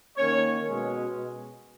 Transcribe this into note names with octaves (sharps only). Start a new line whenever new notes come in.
D#3 A#3 C#4 C#5
B2 G#3 C#4